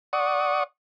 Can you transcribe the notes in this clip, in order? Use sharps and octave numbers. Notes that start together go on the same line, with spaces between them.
D5 F#5 C#6 D#6